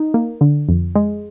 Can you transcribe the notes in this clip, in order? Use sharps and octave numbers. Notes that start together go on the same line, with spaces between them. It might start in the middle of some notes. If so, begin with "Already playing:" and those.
Already playing: D#4
A#3
D3
F2
G#3